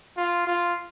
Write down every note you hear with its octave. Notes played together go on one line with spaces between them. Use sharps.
F4
F4